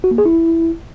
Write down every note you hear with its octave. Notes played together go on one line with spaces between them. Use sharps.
F#4
A#3
G#4
E4